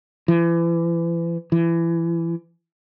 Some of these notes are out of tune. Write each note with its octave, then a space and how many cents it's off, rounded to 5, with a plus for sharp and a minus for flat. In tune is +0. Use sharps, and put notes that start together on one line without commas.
E3 +35
E3 +25